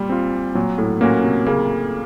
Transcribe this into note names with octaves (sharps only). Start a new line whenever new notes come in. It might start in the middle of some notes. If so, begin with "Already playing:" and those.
Already playing: A#2 G3
C4 F4
A#2 F#3
A2
A#2 A#3 C#4 F#4 A#4
C3
C#3 A#3